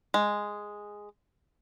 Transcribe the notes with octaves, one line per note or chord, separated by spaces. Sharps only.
G#3